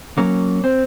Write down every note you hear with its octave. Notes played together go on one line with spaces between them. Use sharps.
F#3 A#3 C#4
C4